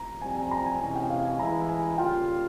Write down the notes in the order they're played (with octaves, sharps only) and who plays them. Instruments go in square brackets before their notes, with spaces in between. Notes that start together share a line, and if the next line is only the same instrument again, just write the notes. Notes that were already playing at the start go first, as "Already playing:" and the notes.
Already playing: [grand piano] A#5
[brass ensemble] F2 C3 G3 C4 [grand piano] G#5
[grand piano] G#5
A#5
G#5
[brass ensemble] C3 E3 G#3 C#4 [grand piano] G#5
[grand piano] G5
F5
G#5
[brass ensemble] E3 G#3 E4 [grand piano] A#5
[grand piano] G#5
[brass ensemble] C#3 G3 A#3 F4 [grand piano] G5